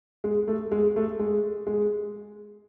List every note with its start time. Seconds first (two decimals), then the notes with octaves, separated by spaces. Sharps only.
0.24 G#3
0.48 A3
0.71 G#3
0.96 A3
1.19 G#3
1.67 G#3